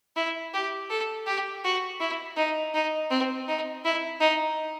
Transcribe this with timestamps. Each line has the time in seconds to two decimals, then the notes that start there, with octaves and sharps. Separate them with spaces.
0.16 E4
0.54 G4
0.90 A4
1.27 G4
1.64 F#4
2.00 E4
2.37 D#4
2.74 D#4
3.11 C4
3.48 D#4
3.84 E4
4.20 D#4